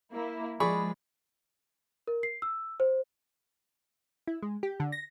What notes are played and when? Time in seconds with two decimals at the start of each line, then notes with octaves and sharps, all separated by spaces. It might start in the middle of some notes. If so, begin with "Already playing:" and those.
0.12 A#3 E4
0.60 F3 G#3 G#4 D5 B5 C#6
2.08 A#4
2.23 C7
2.42 E6
2.80 C5
4.28 E4
4.43 G#3
4.63 G4
4.80 D3
4.92 A#6